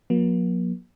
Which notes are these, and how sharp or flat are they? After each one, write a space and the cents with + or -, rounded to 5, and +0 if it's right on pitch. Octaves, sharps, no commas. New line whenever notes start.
F#3 -45 A#3 +40